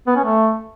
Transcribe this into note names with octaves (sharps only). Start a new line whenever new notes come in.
B3
C#4
A3